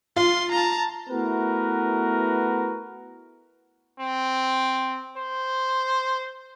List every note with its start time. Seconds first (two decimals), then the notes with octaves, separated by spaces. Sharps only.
0.16 F4 C6
0.52 A5 A#5
1.09 A3 B3 E4 F#4 A#4 B4
4.00 C4
5.17 C5